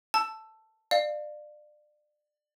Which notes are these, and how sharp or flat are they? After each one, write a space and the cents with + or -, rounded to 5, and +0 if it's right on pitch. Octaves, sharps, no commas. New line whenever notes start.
A5 +0 E6 +10
D5 +25 F5 +0